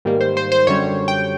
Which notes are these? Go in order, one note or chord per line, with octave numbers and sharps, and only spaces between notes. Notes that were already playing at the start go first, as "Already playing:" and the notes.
G#2 D#3 G3 A#3
C5
C5
C5
F#2 D3 G3 C#5
G5